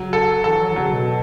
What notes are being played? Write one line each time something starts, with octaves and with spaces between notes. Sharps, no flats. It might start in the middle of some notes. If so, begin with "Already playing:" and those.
Already playing: C#3 F#3
A4
E3 A4
F#3
E3
C#3 F#3
B2